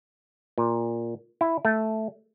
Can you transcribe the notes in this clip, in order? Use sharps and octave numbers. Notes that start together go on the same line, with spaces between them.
A#2
E4
A3